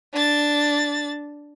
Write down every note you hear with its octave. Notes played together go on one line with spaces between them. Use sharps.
D4 A6